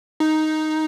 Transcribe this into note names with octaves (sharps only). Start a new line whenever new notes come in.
D#4